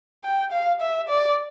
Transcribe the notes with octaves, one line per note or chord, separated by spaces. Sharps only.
G5
F5
E5
D5